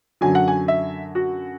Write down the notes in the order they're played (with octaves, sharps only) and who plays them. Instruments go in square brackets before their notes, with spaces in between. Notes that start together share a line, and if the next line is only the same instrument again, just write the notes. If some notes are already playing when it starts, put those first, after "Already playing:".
[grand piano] F#2 D3 F#3 G#5
F#5
G#5
E5
F#4